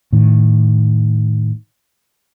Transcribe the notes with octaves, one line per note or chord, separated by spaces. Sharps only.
A2 D#3